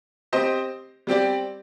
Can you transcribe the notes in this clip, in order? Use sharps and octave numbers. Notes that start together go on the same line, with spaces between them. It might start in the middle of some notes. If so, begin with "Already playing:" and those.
C4 G4 C5 D#5
G3 C4 G4 D5